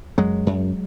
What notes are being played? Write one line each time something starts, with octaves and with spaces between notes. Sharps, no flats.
F#2 F#3 G#3
F#2